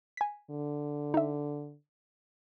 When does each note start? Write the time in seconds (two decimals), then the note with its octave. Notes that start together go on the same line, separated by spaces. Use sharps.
0.17 G#5 B6
0.50 D3
1.14 D#4 E5